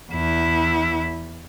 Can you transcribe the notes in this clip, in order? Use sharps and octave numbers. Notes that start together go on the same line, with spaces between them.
E2 E4